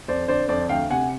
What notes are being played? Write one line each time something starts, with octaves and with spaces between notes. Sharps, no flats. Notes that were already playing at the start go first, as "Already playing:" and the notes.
F2 C5 D5
D3 C5 D5
F2 C5 D5
D2 F5 G5
C3 F#5 G#5